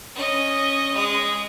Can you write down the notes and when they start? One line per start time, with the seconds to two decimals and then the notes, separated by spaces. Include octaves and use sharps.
0.15 C#4 D#5
0.94 G#3 D#6